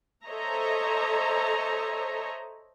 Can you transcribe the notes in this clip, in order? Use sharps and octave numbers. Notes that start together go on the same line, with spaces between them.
A4 C5 C#5 D#5 E5 A#5